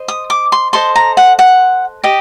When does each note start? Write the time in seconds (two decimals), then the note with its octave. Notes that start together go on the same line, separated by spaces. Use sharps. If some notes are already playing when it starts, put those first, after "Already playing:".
Already playing: C5 D#5
0.08 D#6
0.30 D6
0.52 C6
0.73 A4 C5 D#5 C6
0.96 A#5
1.17 F#5
1.39 F#5
2.04 G4 D#5